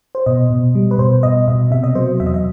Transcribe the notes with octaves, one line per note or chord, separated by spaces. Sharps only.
C5
B2 D#5
B2
G3
B4
B2 C5
B2 D#5
B2 E5
C3 E5
D#5
F#3 C5
E2 E5
D#5
E5